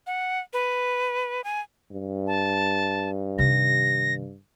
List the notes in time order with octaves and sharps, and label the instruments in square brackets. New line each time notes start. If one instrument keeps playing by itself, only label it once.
[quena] F#5
B4
G#5
[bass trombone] G2
[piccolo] A5
[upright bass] C3 D#3 [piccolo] A#6